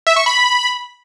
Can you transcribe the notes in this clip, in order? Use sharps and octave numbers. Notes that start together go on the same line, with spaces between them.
E5
C#6
B5